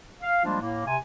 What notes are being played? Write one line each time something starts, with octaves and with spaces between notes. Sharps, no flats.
F5
F3 G3 G#3 A#3 D4 F4
A2 A#3
C3 G#5